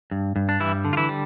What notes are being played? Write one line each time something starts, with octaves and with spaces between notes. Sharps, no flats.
G2
G2
D4
E3 G3 E4
D3
F4
E3 E4
G3